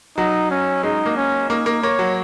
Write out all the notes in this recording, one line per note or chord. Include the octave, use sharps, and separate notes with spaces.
F#3 D#4
C#4
G#3 D#4
A#3
C#4
A#3 D#4
A#3
A#3 C#5
F#3